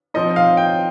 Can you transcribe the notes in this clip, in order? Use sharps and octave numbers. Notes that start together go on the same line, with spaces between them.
F3 C4 D#4 D#5
F5
G5